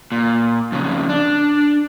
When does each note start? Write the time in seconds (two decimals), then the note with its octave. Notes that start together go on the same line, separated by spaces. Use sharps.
0.12 A#2
0.72 F2 C#3
1.09 D4